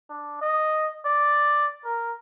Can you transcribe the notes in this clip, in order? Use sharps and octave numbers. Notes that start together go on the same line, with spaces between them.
D4
D#5
D5
A#4